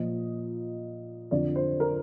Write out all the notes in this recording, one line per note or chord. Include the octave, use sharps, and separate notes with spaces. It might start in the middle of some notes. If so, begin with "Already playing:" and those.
Already playing: A#2 F3 D#5
F2 D3 F3 D5
C5
A#4